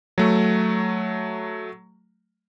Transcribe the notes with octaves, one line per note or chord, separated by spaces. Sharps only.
F#3 A3